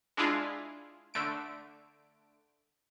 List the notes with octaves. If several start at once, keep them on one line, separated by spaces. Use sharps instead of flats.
G#3 D4 E4 F4 G#4
D3 A3 D7